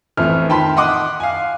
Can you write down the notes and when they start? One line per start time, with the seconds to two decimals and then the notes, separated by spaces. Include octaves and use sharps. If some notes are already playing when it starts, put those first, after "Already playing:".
0.17 A1 F2 E3 A3 F6
0.49 D#3 G5 A5 B5 C6 B6
0.77 D#5 F#5 C6 D6 D#6 F#6
1.20 F5 G#5